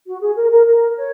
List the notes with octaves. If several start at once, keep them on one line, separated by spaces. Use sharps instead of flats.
F#4
G#4
A#4
A#4
A#4
C#5